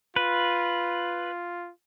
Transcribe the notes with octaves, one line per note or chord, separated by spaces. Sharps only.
F4 B4